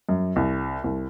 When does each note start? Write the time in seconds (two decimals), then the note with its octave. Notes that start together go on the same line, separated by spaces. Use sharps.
0.09 F#2
0.36 C2
0.84 C2